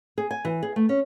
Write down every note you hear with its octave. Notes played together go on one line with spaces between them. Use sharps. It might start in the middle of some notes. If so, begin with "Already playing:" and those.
G#4
G#5
E3
G#4
A3
C#4